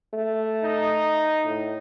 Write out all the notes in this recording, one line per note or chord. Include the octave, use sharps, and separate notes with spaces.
A3
D#4
A2